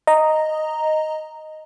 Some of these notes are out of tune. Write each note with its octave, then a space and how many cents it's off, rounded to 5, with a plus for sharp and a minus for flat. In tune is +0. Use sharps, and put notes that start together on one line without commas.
D#5 +0 A#5 -5